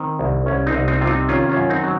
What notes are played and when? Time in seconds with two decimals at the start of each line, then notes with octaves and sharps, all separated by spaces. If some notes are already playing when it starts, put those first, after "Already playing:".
Already playing: D#3 C4 D#4
0.19 C2
0.46 C2 C#4
0.67 C4 D#4
0.73 C2
0.88 C4 D#4
1.01 C3 F4
1.07 C4 D#4
1.29 D#3 C#4 F4
1.49 C#4 F4
1.56 F#2
1.70 C4 D#4
1.83 F#3